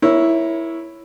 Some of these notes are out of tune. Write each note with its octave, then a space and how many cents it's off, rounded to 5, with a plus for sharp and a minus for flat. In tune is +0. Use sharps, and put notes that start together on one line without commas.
E4 +0 A#4 +25 C#5 +0